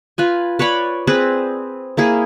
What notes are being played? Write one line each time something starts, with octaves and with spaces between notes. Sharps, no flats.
F4 B4 G#5
B4 C#5 D5 B5
C4 G#4 B4
A#3 E4 G#4